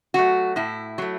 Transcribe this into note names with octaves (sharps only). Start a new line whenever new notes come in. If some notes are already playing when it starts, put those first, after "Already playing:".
F#3 A3 F#4
A2 E4
F#3 A3